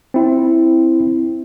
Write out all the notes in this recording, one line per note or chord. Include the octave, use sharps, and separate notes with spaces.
C4 E4